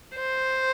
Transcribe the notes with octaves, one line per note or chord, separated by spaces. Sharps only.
C5